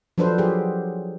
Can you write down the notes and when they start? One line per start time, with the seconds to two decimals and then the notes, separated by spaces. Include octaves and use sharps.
0.18 F3 F#3 D4 A4 B4 C5
0.38 F#3 G4 G#4